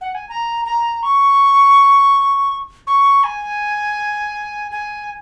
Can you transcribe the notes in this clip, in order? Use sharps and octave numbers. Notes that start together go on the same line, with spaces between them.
F#5
G#5
A#5
A#5
C#6
C#6
G#5
G#5